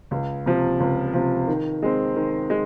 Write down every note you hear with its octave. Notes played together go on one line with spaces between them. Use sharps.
C#2
C3 F3
C#2
C3 F3
D#3
G#3 C4
D#3
G#3